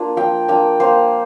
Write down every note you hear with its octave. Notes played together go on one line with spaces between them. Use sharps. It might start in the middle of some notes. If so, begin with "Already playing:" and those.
Already playing: A#3 D4 F4
F3 G5
A#3 D4 F4 G5
A#3 C5